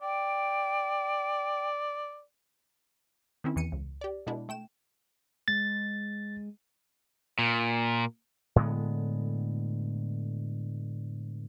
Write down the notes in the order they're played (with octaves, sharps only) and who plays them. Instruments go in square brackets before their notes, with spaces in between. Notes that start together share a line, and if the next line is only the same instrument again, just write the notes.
[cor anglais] D5 [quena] G5
[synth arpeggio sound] D#3 C4 C#4 E4
E2 E3 C#7 D#7
C#2
G4 D5
B2 G#3 B3 D4 E4
A3 G5 E7
[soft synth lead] G#3 [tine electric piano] A6
[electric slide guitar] A#2
[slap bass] A2 D3 G#3 B3